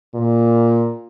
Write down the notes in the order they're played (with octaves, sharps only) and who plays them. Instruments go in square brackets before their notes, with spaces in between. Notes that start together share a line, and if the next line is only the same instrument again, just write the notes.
[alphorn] A#2